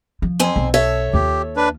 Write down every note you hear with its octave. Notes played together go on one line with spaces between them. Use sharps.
F3
F2 C4 G#5
B1
A4 C#5 E5
D#2 F4 G4
D4 B4